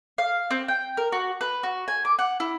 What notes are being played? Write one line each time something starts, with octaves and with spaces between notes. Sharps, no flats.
F5
C4
G5
A#4
F#4
B4
F#4
G#5
D6
F#5
E4